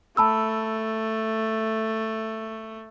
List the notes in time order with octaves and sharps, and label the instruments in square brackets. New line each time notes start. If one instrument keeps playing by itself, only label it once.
[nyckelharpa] A3 [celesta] A5 B5 E6